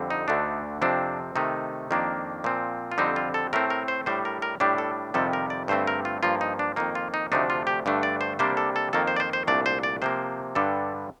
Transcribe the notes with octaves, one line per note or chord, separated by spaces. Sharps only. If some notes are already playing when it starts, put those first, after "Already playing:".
Already playing: F2 D3 G3 C4
D#4
D2 D3 A3 D4
F2 C3 F3 C4 D4
C3 D#3 A3 D#4
F2 D#3 A#3 D4
A#2 F3 C4
F4
F2 D3 G3 C4 D#4
F4
A4
A2 A3 C4 A#4
A#4
C5
A2 G3 D4 C5
A#4
A#4
A2 G3 D4 G4
A4
F2 C3 D#3 G3 A4
A#4
D5
G2 D3 A3 C4 C5
A#4
F4
G2 F3 A#3 F4
D#4
D4
F2 D#3 A#3 D#4
F4
D#4
D2 C3 F3 A3 D4 D#4
F4
G4
G2 D3 A3 D4
D5
C5
C3 G3 A#3 D4 C5
A4
A4
F2 D#3 A#3 A4
C5
D5
C5
C5
C2 A#2 A3 D4 D5
C5
D5
C3 F3 A#3 C5
G2 D3 G3 D4 A4